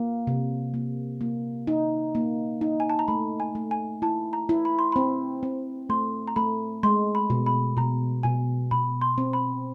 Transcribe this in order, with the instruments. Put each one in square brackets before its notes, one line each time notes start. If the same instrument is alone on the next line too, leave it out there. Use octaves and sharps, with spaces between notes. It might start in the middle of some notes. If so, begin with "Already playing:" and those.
Already playing: [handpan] A#3
C3
A#3
A#3
D#4
A#3
D#4
[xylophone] G#5
A5
A#5
[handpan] A3 [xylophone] B5
[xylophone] G#5
[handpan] A3
[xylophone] G#5
[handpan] E4 [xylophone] A5
[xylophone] A#5
[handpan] E4
[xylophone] B5
C6
[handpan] C4 [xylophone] B5
[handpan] C4
[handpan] A3 [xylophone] C6
[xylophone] A#5
[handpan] A3 [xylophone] B5
[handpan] G#3 [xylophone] C6
[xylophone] B5
[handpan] B2
[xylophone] B5
[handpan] B2 [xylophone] A#5
[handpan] B2 [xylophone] G#5
[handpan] B2 [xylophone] B5
[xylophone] C6
[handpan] C4
[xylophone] B5